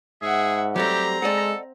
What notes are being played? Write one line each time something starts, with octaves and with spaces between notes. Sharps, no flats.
G#2 G#4 E5 F#5
F#3 G3 A3 C4 G4 A#5
G#3 A4 D5 D#5 F#5